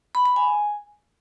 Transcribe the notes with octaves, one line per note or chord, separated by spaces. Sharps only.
B5
B5
G#5